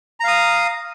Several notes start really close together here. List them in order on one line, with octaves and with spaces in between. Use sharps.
A#5 F5 D#6